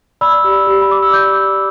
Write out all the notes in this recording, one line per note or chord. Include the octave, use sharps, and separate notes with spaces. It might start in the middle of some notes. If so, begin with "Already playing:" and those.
D5 B5 E6
G4
G4
B5
D5 D6
E6
D5 D6 G6